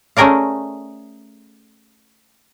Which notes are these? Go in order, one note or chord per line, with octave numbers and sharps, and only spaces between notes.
A3 C#4 G#4 A#4 D5 F5